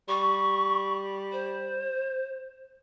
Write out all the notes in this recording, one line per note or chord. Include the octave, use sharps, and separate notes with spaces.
G3 C#6
C5